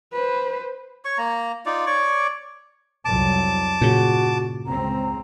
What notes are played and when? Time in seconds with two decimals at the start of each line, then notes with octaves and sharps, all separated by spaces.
0.13 B4 C5
1.05 C#5 C#6
1.18 A#3 A#5
1.66 D#4 F4 D5
1.87 C#5 D5 C#6 D6
3.05 C2 F2 F#3 A5 D6
3.81 G2 A#2 C#3 F#4
4.66 C#2 C4 A#5